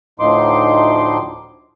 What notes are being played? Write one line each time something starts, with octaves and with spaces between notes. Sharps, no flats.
D2 A2 F3 D#4 C6 D6